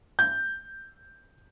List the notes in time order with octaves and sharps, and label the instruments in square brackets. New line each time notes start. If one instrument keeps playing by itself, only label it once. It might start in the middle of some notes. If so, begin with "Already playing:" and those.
[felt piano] G6